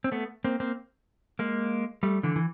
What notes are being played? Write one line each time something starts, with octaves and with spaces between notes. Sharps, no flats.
C4
A3 B3
A#3 C4
A#3 C4
G#3 A#3
G3 A3
D3 E3
E3